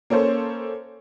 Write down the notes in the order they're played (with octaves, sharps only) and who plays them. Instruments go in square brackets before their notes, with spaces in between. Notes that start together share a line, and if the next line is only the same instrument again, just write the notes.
[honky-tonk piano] A#3 C#4 A4 C5